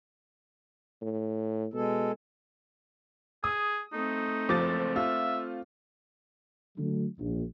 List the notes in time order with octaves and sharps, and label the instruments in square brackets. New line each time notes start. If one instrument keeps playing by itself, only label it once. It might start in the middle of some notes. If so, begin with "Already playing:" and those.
[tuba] A2
[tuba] B2 [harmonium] G#3 A4
[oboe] G#4 [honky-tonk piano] D#6
[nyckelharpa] A3 C4 [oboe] D#4
[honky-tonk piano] F#1 F3 A6 [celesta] C5 D6
[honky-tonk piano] F4 [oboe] E5
[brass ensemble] D3 F#3 A3
A#1